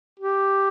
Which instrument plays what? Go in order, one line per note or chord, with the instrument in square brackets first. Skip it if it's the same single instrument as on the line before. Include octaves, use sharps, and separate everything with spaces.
[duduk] G4